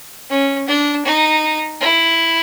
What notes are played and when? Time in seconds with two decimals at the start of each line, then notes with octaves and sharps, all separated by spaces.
0.30 C#4
0.68 D4
1.05 D#4
1.81 E4